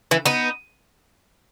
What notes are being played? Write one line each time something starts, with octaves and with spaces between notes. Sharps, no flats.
E3
B3 D#4